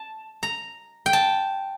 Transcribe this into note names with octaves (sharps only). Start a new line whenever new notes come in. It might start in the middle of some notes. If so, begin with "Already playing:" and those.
Already playing: A5
A#5
G5
A5